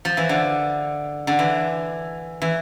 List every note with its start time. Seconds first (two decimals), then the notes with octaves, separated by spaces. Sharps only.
0.05 F3
0.17 E3
0.29 D3
1.27 D3
1.39 E3
2.42 E3